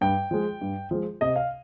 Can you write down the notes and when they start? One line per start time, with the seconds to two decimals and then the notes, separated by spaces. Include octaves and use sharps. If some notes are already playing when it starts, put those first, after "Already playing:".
0.01 G2 G5
0.31 F3 G#3
0.61 G2
0.91 F3 G#3
1.21 C3 D#5
1.36 F5